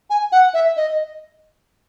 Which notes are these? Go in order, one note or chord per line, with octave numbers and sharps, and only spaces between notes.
G#5
F#5
E5
D#5